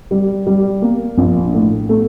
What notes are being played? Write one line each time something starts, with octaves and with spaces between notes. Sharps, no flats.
G3
G3
A#3
A#1
A2
A3